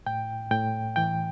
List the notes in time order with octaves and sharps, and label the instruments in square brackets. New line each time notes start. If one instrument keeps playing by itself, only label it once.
[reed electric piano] A2 G5
A2 G5
E3 G5